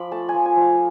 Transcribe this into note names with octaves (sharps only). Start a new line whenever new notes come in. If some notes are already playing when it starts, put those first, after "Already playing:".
Already playing: F3 B5 D6
A3 A5
G#5
F3
G#5
F3
F5